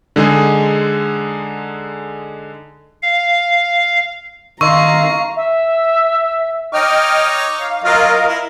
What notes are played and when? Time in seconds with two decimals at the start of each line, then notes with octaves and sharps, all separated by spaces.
0.16 D3 G#3 D#4 G#4
3.02 F5
4.61 D#3 D#5 F5 A#5 C6 C#6 E6
5.36 E5
6.73 D#4 C#5 D#5 G5 D6 F6
7.60 F5
7.84 F#3 F4 A#4 D#5 F5
8.27 E4 A#4